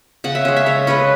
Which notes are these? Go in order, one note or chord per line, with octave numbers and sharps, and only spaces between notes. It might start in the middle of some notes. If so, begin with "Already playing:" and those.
C#3 F#5
E5
G#3 C#4
E5
C#3 C#5
G#3 C#4 B4